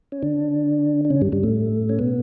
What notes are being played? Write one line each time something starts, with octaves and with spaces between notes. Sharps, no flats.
C#4
D3 D4
D4
C#3 C#4
G2 G3
G2 G3
A2 A3
C#4
B2 B3